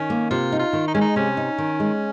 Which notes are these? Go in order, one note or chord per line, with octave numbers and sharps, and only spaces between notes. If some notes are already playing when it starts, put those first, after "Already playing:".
Already playing: D#3 C#4
A#3
C3 F4
D#4
F4
D#3
D#4
G#3 C#4
D#4
C3 C#4
D#4
D#3
G#3